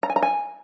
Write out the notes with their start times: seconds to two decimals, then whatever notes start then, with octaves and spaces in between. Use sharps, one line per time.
0.03 A#5
0.10 G#5
0.16 A#5
0.23 G#5